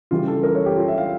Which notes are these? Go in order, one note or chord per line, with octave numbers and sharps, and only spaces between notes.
C#3 E3 G3 F4
A4
A#4
C#5
G4
F4
E5
F5